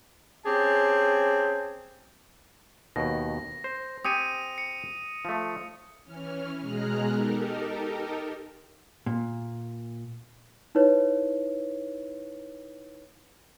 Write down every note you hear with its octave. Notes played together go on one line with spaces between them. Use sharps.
C4 C#4 G4 G#4 G#5 A5
D#2 B2 A#6
C5
C4 G4 G#5 D#6 C#7 D#7
C#7
F3 A3
E3 C#4 F6
B2 G#3 G#4 A#5 F6 F#6
D#4 G4 A4 A#4
A#2
D#4 E4 B4 C#5